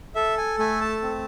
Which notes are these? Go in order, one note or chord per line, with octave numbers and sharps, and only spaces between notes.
A4 E5
G#5
A3 G#5
A5
C4